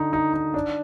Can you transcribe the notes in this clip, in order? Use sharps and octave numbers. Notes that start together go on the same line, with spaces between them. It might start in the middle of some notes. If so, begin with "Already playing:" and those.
Already playing: D3 D#4
D#4
D#4
D4